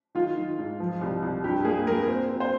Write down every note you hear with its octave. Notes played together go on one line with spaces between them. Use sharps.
D#3 F4
D#3
G#2
F3
C2
C2
G2 G4
A#3 G#4
A#3 A#4
C4
C4
C5